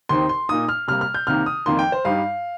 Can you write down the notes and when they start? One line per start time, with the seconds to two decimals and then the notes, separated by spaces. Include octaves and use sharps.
0.09 D#2 D#3 C4 D#4 C6
0.29 C6
0.49 A#2 A#3 D#4 D#6
0.69 F6
0.88 C3 G3 A#3 F6
1.01 F6
1.14 G6
1.27 C2 C3 D#3 A#3 D#4 F6
1.46 D#6
1.66 F2 D#3 A#3 D#4 C6
1.79 G5
1.92 C5
2.05 G2 G3 D#4 F5